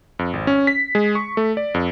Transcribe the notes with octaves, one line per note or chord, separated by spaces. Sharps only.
F2
G#1
C#4
B6
G#3
C#6
A3
D5
F2